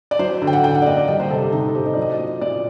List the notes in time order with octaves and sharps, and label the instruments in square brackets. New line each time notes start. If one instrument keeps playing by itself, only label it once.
[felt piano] D5
F#3 C5
D3
G5
F#5
D3 G5
F#5
D5
A#3 D#5
D5
G3 D#5
C5
C3 A4
G4
C3 D#4
A4
C4 G4
D#5
F#3 D5
D#5
A#2
A#2 D5